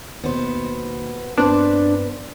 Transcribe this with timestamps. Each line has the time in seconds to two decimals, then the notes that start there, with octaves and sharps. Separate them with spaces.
0.24 D#2 B2 B3 C5
1.37 G2 B3 C4 D4 B4 C5